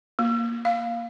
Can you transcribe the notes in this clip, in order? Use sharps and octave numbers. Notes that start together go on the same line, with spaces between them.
A#3
F5